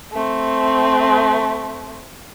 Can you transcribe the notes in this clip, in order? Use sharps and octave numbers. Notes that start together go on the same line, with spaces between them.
A3 C4